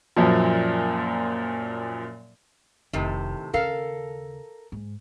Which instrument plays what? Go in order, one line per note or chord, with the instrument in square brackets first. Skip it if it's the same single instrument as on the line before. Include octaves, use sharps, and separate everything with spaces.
[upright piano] F#2 A#2 F3
[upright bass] F1 [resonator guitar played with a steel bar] A2 C3 D#3
[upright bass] D#2 C#3 [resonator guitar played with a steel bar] A4 A#4 F5
[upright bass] G#2